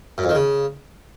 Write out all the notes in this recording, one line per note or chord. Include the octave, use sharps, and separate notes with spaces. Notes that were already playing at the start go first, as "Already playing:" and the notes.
F#2
F2
D#3
C#3